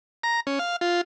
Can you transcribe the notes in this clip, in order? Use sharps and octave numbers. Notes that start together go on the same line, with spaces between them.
A#5
C#4
F5
F4